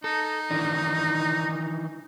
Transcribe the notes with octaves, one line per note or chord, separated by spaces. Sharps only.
D#4 A4
D#3 E3 D4